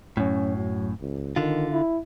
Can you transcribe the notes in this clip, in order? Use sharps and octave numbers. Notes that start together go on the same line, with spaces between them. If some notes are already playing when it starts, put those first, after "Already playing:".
F#2 A2 C#4
F#3
C#2
D3 D#3 F4
E4